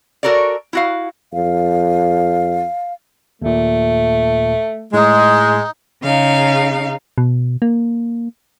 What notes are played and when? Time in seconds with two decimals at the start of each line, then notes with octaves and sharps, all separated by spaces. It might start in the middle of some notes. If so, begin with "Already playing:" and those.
0.23 F#4 A4 A#4 C#5 D5
0.73 E4 F#4 F5
1.33 F2 F5
3.42 D#2 A#2 A3
4.93 A2 G#3 D#4
6.03 C#3 D#4 F5
7.18 B2
7.62 A#3